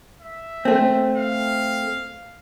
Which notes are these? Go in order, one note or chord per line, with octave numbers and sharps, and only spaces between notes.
E5
A3 C4
F5